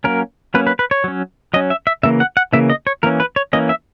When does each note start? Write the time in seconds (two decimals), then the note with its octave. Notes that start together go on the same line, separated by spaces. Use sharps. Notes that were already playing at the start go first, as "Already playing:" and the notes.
0.04 F#3 A#3 C#4 A#4
0.54 F#3 A#3 C#4 B4
0.67 B4
0.79 B4
0.91 C#5
1.04 F#3 C#4
1.54 F#3 C#4 D#5
1.70 E5
1.87 E5
2.03 C#3 E3 A#3 E5
2.20 F#5
2.37 F#5
2.53 C#3 E3 A#3 E5
2.70 D#5
2.87 C#5
3.03 E3 A#3 C#4 A#4
3.20 B4
3.36 C#5
3.53 E3 A#3 C#4 D#5
3.69 E5